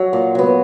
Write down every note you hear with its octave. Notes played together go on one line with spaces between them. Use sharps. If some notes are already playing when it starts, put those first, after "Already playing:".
Already playing: F#3
A#2
F#3 B3